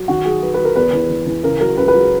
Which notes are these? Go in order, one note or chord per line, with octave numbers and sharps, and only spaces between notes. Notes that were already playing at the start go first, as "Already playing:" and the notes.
Already playing: F#3
D#3 F#4
F#3 G#4
F#3 B4
F#3 B4
A#4
E2 B4
E3
E3
E3
C#3 A#4
F#3 A#4
C#2 B4
B4
F#3